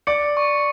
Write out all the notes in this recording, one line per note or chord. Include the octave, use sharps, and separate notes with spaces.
D5 C#7
C#6